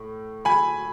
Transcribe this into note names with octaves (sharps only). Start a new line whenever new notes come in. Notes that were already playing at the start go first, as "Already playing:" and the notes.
Already playing: A2
G#5 B5